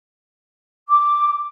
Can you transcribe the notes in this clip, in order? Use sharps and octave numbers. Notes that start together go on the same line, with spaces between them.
D6